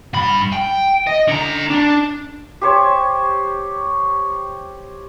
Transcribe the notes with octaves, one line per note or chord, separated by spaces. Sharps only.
G2 B5
G5
D#5
D3 A#5
D4
G4 C5 C#5